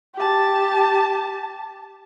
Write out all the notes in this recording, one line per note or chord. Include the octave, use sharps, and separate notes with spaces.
G4 A5